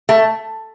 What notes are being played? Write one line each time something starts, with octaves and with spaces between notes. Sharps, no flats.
A3